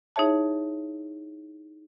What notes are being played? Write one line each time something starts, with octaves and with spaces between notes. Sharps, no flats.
D#4 E4 G#4 C#5 E5 A5